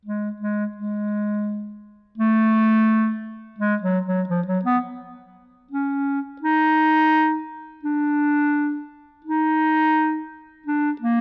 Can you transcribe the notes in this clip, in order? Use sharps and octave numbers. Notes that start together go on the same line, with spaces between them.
G#3
G#3
G#3
A3
G#3
F#3
F#3
F3
F#3
B3
C#4
D#4
D4
D#4
D4
A#3